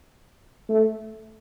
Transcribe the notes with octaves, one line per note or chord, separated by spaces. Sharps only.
A3